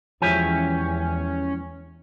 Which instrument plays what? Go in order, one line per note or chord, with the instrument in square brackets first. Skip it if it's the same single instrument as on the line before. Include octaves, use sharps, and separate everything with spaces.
[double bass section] E2 [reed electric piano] F3 G#3 E4 [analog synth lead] C#4 [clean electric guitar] G4 G#5